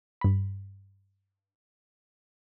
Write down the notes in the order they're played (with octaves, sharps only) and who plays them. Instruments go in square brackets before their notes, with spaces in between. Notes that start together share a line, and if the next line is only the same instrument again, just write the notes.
[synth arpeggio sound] G2 B5